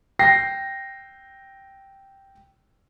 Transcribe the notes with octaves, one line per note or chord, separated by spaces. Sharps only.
G5 A#6 C7